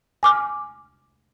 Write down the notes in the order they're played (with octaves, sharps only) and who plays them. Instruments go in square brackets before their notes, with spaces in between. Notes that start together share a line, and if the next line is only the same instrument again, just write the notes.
[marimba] G#5 D6 F6